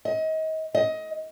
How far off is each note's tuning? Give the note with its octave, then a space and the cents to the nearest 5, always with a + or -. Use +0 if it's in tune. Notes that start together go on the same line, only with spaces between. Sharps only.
D#5 +30
D#5 +20